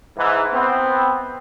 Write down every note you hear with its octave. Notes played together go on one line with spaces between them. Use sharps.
G#2 E3
B3 C4